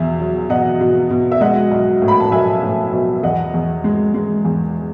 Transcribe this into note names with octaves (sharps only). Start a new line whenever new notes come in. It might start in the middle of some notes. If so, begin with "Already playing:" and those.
Already playing: E2 B2 E5
F#3
B2 D#5 F#5
B2
B2
E5
G#3 D#5 F#5
B1
A2
B5
A5
B1 E5 G#5
A2
B1
E2 D#5 F#5
E2
G#3
G#3
E2